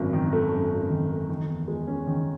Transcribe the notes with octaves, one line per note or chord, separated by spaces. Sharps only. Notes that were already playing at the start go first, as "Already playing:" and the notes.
Already playing: G#1 F#2
D#3
A3
F#2
G#1
D#3
A3
D#3
E2
G#3
C#4
D#3